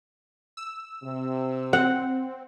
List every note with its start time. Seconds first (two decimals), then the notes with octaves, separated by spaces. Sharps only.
0.57 E6
1.04 C3
1.73 C4 F#5